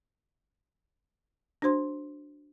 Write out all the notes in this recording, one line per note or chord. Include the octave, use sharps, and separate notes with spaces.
D4 F#4 C5 C6